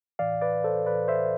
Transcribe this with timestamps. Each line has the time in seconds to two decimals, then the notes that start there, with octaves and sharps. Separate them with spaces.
0.19 A2 E3 D5 F5
0.41 B4 D5
0.64 A4 C5
0.86 A2 E3 B4 D5
1.08 C5 E5